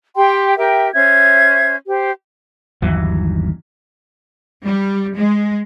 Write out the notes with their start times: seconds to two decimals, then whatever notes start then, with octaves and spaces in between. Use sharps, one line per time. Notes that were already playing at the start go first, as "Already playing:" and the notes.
0.17 G4 G5 C6
0.58 G4 A#4 E5 G5
0.94 C#4 C5 E5 G#6
1.87 G4 C5
2.82 G1 D#2 E3 F#3
4.64 G3
5.15 G#3